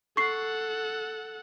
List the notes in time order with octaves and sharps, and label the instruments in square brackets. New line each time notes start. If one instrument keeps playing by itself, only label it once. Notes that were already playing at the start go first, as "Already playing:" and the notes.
[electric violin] A4 F#5 [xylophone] C#6 C7